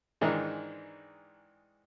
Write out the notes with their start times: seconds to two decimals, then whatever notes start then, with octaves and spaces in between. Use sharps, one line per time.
0.21 G#2 D#3 E3 G#3 D4 D#4